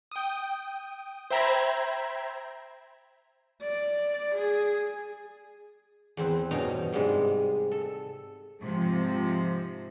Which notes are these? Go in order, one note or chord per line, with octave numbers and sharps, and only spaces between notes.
G5 D#6
C5 E5 G5 A#5 B5 G#6
D5
G#4
E2 C4 B4
G2 B2 C#4 D#4 A#5
G#2 C3 G3 G#3
A4
G#2 C3 F3